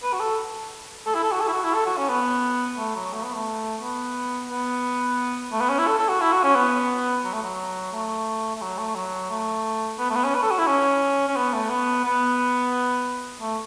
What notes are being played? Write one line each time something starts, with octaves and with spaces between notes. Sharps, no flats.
B4
F#4
A4
A4
E4
A4
F#4
A4
E4
F#4
E4
A4
F#4
C#4
B3
A3
F#3
A3
B3
A3
B3
B3
A3
B3
C#4
E4
A4
A4
F#4
E4
F#4
C#4
B3
F#3
A3
F#3
A3
A3
F#3
A3
F#3
A3
B3
A3
B3
C#4
B4
A4
F#4
E4
C#4
C#4
B3
A3
B3
B3
A3